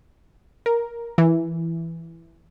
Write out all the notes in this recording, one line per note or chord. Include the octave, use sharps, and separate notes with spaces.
A#4
E3